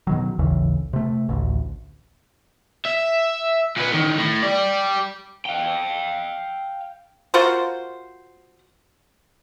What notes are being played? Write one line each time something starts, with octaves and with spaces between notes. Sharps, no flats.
B2 D#3 F#3
A1 D#2 C#3 E3
C3 A3
A1 D2
E5
A#2 B3
A2 D#3
A2
G4 D5
F5 G5
F4 F#4 A#4 C5